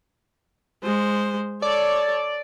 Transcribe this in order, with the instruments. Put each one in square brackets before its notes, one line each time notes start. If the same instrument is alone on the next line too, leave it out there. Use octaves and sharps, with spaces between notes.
[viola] G#3 C5
[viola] A4 C#5 [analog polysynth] D5